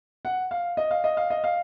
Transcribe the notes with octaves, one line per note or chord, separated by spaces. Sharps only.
F#5
F5
D#5
F5
D#5
F5
D#5
F5